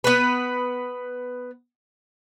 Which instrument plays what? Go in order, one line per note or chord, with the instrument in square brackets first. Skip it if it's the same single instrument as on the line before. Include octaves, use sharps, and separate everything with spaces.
[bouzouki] B3 B4